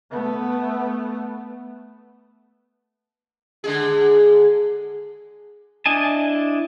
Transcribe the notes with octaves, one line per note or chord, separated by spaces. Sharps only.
A3 B3
D3 G#3 G#4
D4 E4 D#5 G#5 A5